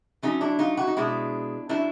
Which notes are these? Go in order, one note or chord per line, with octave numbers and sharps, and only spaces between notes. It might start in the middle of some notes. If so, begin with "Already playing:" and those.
D3 F#3 A3 C#4 D#4
D4 E4
D#4 F4
E4 F#4
D#4
B2 G#3 D4 E4
A2 F#3 A3 D4 E4